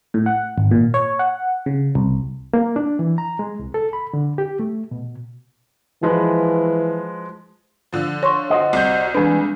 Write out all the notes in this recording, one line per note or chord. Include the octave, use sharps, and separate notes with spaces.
A2
F#5
G#1
A#2
C#5
F#5
C#3
C2
A#3
D4
E3
A#5
G#3
C2
A4
B5
D3
G4
A3
B2
E3 F3 G#3 B4
D3 F3
C#5 C6 C#6
F#4 C5 D#5
C2 G6
E3 G#3 D4 G#4 B4